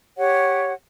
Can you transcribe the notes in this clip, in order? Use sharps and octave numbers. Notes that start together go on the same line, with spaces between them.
G4 C#5 F#5